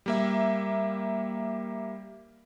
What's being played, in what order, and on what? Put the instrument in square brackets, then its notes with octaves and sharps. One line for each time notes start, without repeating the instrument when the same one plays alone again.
[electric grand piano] G3 A#3 E5